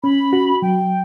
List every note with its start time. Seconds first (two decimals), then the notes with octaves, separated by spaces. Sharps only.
0.03 C#4 B5
0.33 F#4
0.62 F#3 G5